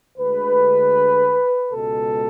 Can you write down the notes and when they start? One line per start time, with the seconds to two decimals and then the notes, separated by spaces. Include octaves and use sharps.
0.18 D2 D3 G#3 B4
1.72 C#2 B2 G#3 A4